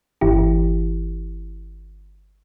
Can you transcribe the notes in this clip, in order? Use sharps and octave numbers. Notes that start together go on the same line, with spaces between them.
G1 E3 E4 G4